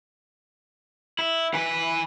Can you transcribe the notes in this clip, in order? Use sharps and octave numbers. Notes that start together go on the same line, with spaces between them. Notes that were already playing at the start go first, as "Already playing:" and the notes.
E4
E3 B4